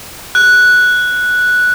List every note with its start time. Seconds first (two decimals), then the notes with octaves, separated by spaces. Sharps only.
0.35 F#6